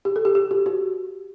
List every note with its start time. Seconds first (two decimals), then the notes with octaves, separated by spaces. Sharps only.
0.05 G4
0.16 A4
0.25 G4
0.35 G4
0.51 F#4
0.66 F#4